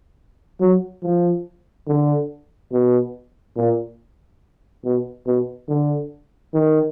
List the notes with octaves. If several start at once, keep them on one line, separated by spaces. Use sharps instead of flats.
F#3
F3
D3
B2
A#2
B2
B2
D3
D#3